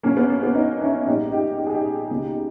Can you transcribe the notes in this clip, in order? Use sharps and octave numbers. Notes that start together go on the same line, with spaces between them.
B1 B2 A#3 C#4
B3
A#3
B3
B3 D#4
C#4 E4
A#1 G#2 G3 A#3 D#4 G4
D#4 G4
G4
G#4
D#4 G4
C#2 B2 A#3